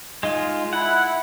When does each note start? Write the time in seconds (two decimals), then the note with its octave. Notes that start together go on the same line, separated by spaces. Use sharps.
0.23 G#3 D#4 F4
0.73 E4 F#5